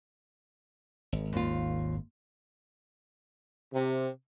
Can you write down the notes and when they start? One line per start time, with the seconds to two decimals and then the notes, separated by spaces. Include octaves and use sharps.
1.13 G#1
1.33 D#2 F4
3.73 C3